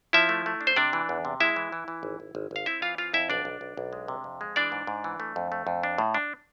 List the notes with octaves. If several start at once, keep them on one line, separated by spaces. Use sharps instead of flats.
F3 E4 E5
A3
A3
D4
C5
C3 D4 D5
E3
E2
C3
G#3 E4 E5
E3
E3
E3
G#1
G#1
G#1
G#1 F5
C4 E4 E5
E3 F4 F5
C4 F4 F5
F2 E4 E5
B1 D4 D5
B1
B1
B1
G#3
C3
F2
G#3
E3 D4 D5
G#2
G#2
E3
A3
F2
A3
F2
D4
A2
D4